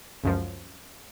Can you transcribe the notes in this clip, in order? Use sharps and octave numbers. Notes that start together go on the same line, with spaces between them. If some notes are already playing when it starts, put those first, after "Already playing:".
C#2 F#2 F3